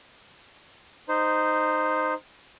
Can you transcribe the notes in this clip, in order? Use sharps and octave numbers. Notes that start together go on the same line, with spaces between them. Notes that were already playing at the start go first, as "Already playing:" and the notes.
D#4 C5